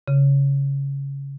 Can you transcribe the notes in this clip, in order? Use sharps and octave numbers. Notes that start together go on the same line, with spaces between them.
C#3